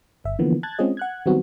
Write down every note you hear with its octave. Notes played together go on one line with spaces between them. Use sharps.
G1 E5
D3 E3 F3 A#3 B3
A5 F#6 G#6 A6
G#3 C4 C#4 F4 G#4 D#5
F#5 F#6 G#6
D#3 F#3 G3 B3 C4 F#4